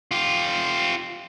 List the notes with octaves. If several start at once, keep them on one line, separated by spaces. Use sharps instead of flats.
F4 G4